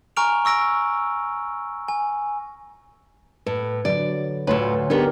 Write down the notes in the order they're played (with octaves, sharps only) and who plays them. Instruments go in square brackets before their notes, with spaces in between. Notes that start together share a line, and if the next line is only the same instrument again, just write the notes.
[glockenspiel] G#5 A#5 C#6 F6 D7 F7
C#6 E6 A#6 D7
G#5
[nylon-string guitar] A2 [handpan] B4
[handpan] D3 F#3 [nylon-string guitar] D5
[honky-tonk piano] D2 C#5 C6 [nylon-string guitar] A2 F4 B4
[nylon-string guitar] B3 D#4 G#4 [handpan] D4 G4 A#4